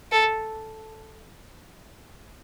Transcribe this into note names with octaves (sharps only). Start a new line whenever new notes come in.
A4